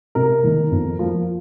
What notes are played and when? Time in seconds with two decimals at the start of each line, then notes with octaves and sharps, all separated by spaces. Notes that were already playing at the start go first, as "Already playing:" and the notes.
0.15 C3 A#4
0.43 D#3 A#3
0.72 F2
0.99 F3 A#3